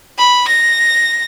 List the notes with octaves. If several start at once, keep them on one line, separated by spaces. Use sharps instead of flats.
B5
A#6